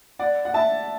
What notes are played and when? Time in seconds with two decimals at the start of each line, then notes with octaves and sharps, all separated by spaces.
0.19 D5 F#5
0.45 F#5
0.54 E5 A5